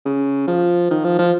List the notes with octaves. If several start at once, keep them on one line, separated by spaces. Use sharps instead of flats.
C#3
F3
D#3
F3
F3